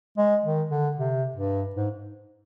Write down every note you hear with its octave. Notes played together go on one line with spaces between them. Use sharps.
G#3
D#3
D3
C3
G2
G#2